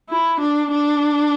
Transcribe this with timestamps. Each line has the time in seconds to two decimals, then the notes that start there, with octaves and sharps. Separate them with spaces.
0.09 E4
0.40 D4
0.71 D4